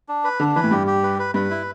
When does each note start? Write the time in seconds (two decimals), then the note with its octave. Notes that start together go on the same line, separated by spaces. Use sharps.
0.09 D4
0.24 B4
0.40 D3 D4
0.56 E3 B4
0.63 A2
0.71 G2 G4
0.87 G4
1.03 B4
1.19 B4
1.34 G2 B4
1.50 E4